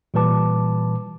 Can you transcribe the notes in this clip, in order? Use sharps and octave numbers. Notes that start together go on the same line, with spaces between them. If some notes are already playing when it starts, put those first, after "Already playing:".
A#2 E3 G3 B4 A5 D6